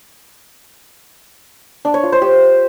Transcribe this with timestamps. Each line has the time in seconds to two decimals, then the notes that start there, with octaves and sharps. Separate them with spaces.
1.85 D4
1.94 C#5
2.03 F4
2.12 C5
2.22 G4